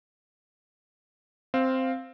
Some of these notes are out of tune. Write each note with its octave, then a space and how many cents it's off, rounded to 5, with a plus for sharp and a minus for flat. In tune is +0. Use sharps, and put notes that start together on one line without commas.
C4 +0 F5 +0